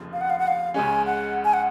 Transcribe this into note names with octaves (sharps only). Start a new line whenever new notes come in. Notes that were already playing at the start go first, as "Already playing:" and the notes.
Already playing: F1 D#2 C#3 F3
F5
F#5
F5
F#5
F5
C#2 C#3 G#3 C#4 G#5
F#5
G#5
F#5